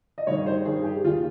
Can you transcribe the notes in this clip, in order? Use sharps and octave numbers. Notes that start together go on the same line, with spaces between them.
D#5
G2 D#3 G3 C#5
C5
G2 D#3 G3 G#4
G#4
G4
D#2 D#3 G#3 F4